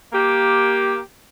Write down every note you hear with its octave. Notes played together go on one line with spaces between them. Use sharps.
A#3 G4